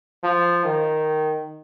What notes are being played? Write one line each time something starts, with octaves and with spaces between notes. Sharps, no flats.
F3
D#3